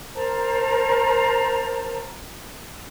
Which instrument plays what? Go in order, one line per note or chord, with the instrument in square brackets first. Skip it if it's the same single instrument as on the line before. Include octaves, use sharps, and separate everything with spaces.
[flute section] A#4 C5 A5 A#5